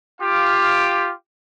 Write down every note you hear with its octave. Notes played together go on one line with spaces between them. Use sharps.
F4 G4 F5 D6